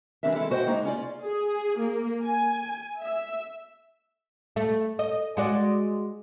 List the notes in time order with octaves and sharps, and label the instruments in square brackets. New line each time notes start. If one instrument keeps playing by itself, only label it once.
[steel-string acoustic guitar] E3 G3 C4 D4 A#4 E5
G#3 E4 A4
F#4 C5 D#5 F5 G5
G#3 A#3 D#4 E4
C#4 F4 D5
[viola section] G#4
A#3
G#5
E5
[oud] A3
D#5
G#3 F#4 D5